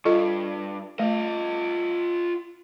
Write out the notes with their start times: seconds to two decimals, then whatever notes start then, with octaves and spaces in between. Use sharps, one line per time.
0.05 G2 F4 A4 D#5
0.99 A3 F4 D#5